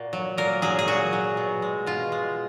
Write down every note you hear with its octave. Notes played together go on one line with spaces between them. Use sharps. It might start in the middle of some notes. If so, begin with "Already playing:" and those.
Already playing: A#2 F#4
F#3
A#2 A#4
F#3 G#4
G#4
A#2 F#4
F#3
B2
G#3
B2 F4
G#3